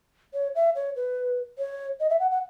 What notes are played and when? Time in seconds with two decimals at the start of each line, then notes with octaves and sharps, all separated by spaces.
0.34 C#5
0.55 E5
0.75 C#5
0.96 B4
1.59 C#5
2.00 D#5
2.10 E5
2.20 F#5
2.31 F#5